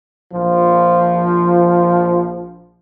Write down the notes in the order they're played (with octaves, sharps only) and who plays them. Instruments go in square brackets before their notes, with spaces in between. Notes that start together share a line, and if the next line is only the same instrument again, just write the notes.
[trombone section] A#1 F3